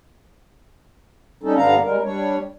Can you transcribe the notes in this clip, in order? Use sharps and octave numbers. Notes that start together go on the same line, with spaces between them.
G3 C#4 D#4 A4
G2 D3 B3 D4 F5 A#5
G3 G#3 A#4
G3 D4 C#5